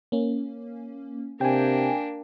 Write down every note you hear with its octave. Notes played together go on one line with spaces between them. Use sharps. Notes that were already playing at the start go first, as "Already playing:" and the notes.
A#3 C#4
C3 A#3 D4 G5 G#5